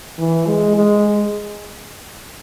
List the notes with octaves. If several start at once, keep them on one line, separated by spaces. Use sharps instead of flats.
E3
G#3
G#3